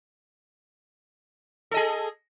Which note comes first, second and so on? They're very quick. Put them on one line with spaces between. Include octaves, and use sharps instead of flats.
A4 D#5 G#4